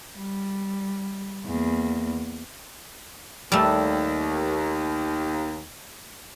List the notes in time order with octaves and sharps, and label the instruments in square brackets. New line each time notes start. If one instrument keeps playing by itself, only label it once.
[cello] G3
E2 A#3
[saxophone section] D#2 [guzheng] G3 A3